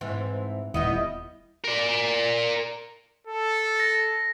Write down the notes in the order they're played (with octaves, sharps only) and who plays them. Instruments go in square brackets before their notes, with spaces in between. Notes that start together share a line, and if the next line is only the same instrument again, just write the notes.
[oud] G#2 E3 C4
[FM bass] D#1 [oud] G3 B3 E4 [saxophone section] D#5
[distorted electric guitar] A#4 D5
[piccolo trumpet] A4
[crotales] A#6